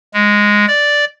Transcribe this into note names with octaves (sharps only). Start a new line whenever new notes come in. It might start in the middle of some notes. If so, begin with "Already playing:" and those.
G#3
D5